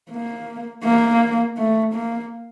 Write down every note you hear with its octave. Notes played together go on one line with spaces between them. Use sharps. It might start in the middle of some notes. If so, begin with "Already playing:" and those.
A#3
A#3
A3
A#3